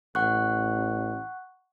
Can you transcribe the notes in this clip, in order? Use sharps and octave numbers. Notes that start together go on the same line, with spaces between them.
A1 F#5 C#6 F#6